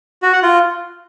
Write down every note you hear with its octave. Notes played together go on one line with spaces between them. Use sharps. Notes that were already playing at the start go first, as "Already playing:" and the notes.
F#4
F#5
F4